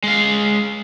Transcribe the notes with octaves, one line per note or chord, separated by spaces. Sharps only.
G#3 F5